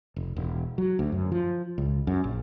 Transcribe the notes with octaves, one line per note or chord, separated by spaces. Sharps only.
F1
E1
F#3
D2
F#2
F3
C#2
F#2
A#1